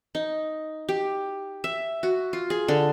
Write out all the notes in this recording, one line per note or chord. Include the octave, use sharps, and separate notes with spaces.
D#4
G4
E5
F#4
F4
G#4
D3